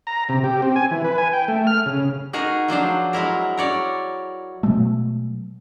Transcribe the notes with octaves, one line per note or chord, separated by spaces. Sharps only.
A#5
C3
G4
C4
G#5
E3
B4
G#5
G5
A3
F6
C#3
D#4 F#4 G#4 A#4
F3 F#3 D4 C5
F#3 G#3 E4 A#4
A#4 C#5 D5
B2 F#3 G#3 A3